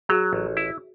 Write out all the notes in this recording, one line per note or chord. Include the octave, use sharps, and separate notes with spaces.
F#3 F#4 G#4
A1
E4